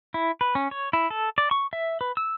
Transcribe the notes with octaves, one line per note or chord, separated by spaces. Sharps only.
E4
B4
C#4
C#5
E4
A4
D5
C#6
E5
B4
E6